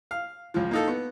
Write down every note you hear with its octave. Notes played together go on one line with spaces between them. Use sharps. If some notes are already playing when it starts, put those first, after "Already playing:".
F5
C#2 F3
A#3 D#4 A4
B3